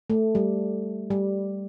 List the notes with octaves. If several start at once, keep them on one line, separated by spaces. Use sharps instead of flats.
A3
G3
G3